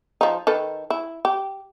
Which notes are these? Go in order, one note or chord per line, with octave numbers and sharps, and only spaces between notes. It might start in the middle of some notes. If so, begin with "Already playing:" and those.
F3 D#4
D#3 A4 B4
E4
G4